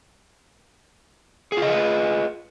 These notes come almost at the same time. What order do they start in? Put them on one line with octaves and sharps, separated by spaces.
G#4 F4 D#5 A4 B4